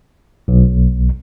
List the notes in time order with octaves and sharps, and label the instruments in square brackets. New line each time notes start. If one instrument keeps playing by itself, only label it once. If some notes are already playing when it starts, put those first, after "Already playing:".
[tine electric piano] B1